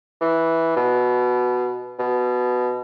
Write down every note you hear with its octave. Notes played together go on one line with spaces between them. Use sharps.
E3
B2
B2